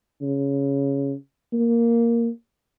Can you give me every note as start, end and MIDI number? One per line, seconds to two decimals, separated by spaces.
0.22 1.14 49
1.53 2.29 58